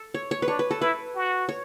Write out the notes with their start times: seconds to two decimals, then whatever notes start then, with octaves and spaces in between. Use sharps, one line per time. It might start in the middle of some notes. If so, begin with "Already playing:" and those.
Already playing: A4
0.14 C#5
0.31 C#5
0.42 B4
0.48 D4 C#5
0.59 B4
0.71 A4
0.81 E4 B4
1.15 F#4
1.49 C#5